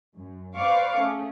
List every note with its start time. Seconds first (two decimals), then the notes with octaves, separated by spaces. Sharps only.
0.15 F#2
0.55 B4 C5 D5 F5 C#6 D6
0.96 A3 C#4 G#4